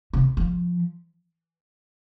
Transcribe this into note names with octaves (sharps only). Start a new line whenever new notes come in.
C3
F3